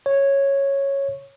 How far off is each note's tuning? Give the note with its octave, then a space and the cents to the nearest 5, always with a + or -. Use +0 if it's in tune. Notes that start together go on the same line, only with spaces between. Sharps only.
C#5 -5